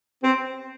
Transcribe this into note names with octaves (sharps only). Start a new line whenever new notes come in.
C4